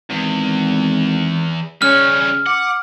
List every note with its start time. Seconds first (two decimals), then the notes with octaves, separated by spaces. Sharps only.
0.10 G#1 E2
1.82 C#3 G3 C#4 C#5 F6
2.46 F#5 D6